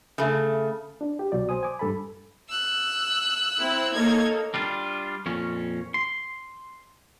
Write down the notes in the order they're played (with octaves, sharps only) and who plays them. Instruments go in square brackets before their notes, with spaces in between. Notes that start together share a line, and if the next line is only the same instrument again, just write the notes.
[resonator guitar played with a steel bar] C#3 A3
[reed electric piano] D4
G4
C2 B2 F#3 D5
C5 G#5 D#6
G#5 D6
G2 A4 A5 B5
[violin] E6 F#6
[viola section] C4 E4
[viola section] A#3 D#4 A4 [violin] C#5 G#6
[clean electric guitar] G3 D4 F4
F2 A#2 C#4
C6